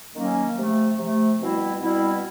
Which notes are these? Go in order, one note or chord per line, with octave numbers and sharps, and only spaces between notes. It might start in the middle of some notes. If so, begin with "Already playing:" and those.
D#3 F#3 A#3 C#4
C3 F3 A3
C3 F3 A3
B2 G3 C4 E4
B2 G3 C4 E4